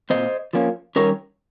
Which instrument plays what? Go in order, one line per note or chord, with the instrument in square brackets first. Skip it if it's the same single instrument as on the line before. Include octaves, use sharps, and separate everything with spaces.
[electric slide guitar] A#2 G3 C4 C5 D#5
F3 A#3 C#4
D#3 G3 C#4 A#4 C#5